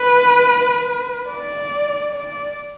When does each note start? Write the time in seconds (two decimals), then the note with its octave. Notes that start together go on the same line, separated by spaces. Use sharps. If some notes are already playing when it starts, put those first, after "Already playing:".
Already playing: B4
1.30 D5
2.12 D5